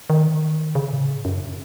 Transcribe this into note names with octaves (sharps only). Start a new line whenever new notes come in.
D#3
C#3
A2
G#2
F#2